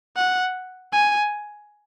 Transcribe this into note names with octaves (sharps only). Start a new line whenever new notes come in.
F#5
G#5